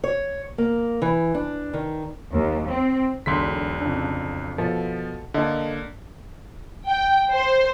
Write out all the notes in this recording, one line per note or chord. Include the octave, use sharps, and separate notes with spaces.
C#5
A#3
E3
D4
D#3
D#2
C4
E1 B1 D3 C6 B6
F2 C#3 D4
B2 F3 A4
D3 A#3 A4 D#5
G5
C5